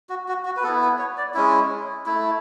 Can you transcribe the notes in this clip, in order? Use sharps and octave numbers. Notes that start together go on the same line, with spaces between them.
F#4
F#4
F#4
B4
B3 E4 A4
B4
C#5
D5
G#3 C#4 E4
A3 E4